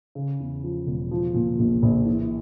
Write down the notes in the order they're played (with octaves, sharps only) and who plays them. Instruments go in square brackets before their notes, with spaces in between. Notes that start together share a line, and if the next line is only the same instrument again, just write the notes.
[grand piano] C#3
E2
F3
E1
F3
A#2
A#1
A#1
E3